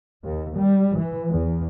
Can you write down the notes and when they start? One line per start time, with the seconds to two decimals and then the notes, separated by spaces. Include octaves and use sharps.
0.24 D#2
0.57 G3
0.96 E3
1.30 E2